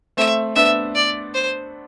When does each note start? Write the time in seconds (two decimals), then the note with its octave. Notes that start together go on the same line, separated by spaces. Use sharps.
0.17 A3 C4 E5
0.56 B3 D4 E5
0.95 D5
1.34 C5